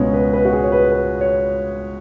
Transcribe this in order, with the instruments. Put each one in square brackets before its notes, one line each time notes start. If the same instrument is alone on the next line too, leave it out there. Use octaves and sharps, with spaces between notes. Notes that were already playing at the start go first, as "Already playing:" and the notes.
Already playing: [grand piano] C#2 B2 G#3 B3 C#4
B4
B4
F#4
G#4
C#5
B4
B4
C#5